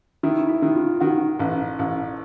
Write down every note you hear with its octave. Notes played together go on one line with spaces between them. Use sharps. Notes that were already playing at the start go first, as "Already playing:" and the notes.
D#3 E4
E4
D#3
F4
D#3 F#4
A1
A1